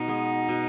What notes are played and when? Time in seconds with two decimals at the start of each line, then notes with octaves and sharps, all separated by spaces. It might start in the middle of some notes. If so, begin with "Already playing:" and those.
Already playing: B2 D#4
0.08 G#3 B3
0.49 B2